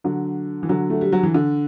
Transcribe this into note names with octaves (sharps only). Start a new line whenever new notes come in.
D3 F#3
E3
D3 F#3
A3
G3
F#3
E3
D3